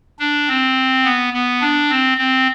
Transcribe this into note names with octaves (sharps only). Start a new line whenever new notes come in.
D4
C4
B3
B3
D4
C4
C4